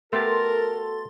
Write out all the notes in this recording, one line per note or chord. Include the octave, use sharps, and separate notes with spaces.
A3 B3 F#4 G4 A4 A#4 C6 A6